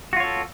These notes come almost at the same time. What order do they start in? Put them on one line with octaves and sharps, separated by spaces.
F#4 F4 C#5 A4